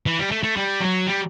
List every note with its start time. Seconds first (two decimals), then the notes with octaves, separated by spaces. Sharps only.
0.06 E3
0.19 G3
0.31 A3
0.43 A3
0.56 G3
0.81 F#3
1.07 G3